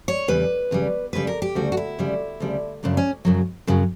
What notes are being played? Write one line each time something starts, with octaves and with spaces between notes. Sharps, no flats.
C#5
E2 C#3 G3 B4
E2 C#3 G3
D2 C#3 G3 B4
A#4
G4
D2 C#3 G3 F#4
F#4
E4
D2 C#3 G3
D2 C#3 G3
F#2 C#3 F#3 D4
C#4
F#2 C#3 F#3
F#2 C#3 F#3